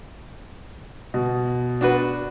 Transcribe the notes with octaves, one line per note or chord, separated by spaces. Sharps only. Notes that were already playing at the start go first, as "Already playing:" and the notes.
B2
D4 F#4 B4